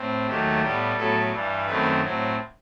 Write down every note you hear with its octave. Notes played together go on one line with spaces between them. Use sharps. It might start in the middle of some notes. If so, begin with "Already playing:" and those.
Already playing: A2 C4
D#2 D#3 F#3 A3 G4
A2 G3 B3 G4
A2 F#3 B3 A4
G2 E3 G3
F#2 D#3 A3 C4 B4
A2 F#3 C4